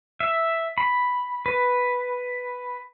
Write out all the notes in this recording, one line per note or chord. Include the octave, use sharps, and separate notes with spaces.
E5
B5
B4